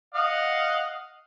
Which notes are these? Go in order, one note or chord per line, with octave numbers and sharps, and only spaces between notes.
D#5 F5 F#5